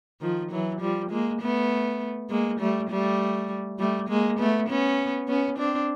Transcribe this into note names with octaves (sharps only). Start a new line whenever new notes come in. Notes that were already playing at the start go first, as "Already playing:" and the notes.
D#3 F3
E3 F#3
F3 G3
G#3 A#3
A3 B3
G#3 A#3
G3 A3
G3 A3
G3 A3
G#3 A#3
A3 B3
B3 C#4
B3 C#4
C4 D4